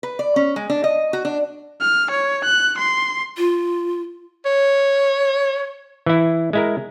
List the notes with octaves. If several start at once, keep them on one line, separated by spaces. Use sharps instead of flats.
B4
D5
C#4
G#3
D4
D#5
F#4
D4
F6
C#5
F#6
C6
F4
C#5
E3 E4
G#3 E4 A#4